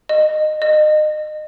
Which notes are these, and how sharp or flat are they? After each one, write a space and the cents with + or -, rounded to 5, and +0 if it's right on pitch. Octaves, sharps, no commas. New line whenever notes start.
D#5 -20
D#5 -30